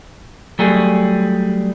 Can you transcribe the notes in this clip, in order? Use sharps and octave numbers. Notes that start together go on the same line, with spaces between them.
F#3 G3 A3 G#4